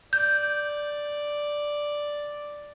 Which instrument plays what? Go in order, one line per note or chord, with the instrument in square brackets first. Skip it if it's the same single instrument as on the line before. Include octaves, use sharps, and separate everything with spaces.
[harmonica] D5 [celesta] G6